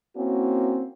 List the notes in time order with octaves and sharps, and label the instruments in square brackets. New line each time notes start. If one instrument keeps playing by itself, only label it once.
[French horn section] A#3 C4 C#4 E4 F#4